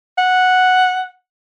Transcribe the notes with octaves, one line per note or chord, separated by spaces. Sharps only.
F#5